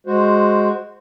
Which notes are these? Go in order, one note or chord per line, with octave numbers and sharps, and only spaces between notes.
G#3 F#4 C5